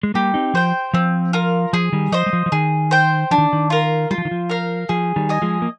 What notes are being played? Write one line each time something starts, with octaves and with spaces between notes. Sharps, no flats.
G#3
G3 A#3 G4
C4 D#4
F3 C5 G5
F3 C4
F4 A#4 F5
F3 G#4
D#3 G3
F3 C5 D#5
G3
F3
F3
D#3 G#4
C5 G5
F3 D4
D#3
D#3
F4 A#4
G3 F4
F3
D#3
F3
A#4 F5
F3 G#4
D#3 G3
D#5 G#5
F3 G#3
A#3